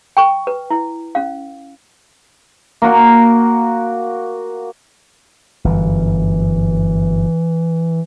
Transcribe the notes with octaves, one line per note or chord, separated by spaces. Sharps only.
G5 C#6
B4
E4
C#4 F5
A#3 F#4
G1 F#2 E3